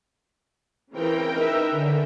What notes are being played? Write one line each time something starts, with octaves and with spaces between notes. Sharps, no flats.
C#3 E3 C4 A#4 G5
D#4 B4 E5
D3 C#4